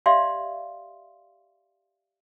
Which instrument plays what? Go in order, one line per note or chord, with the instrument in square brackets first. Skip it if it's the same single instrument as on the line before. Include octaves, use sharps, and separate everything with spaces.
[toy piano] G4 D5 E5 F5 C6